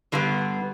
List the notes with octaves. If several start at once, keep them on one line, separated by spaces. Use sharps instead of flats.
G2 D3 G3 B3